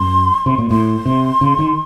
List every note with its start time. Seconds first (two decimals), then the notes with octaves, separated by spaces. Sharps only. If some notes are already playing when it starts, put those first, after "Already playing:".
Already playing: F#2 C6
0.46 C3
0.58 A#2
0.71 A2 C6
1.06 C3
1.41 C#3
1.59 D#3